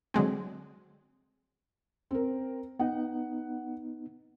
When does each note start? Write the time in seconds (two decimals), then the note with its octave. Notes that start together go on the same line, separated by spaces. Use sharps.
0.14 D3 F#3 G#3 C4
2.11 C4 A#4
2.79 B3 D#4 F#5